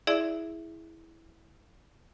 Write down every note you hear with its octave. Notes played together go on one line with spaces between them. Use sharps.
E4 G#4 D5 E5